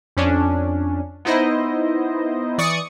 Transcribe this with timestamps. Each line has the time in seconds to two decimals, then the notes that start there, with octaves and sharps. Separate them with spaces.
0.17 F2 C#4 D4
1.25 B3 D#4 E4 C5 D#5
2.58 E3 D5 C#6 D#6 C#7